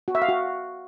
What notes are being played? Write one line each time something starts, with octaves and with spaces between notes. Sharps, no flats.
F#4
E5
F5
F#4